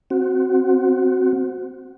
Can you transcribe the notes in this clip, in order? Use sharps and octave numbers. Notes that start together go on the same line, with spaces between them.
C4 F#4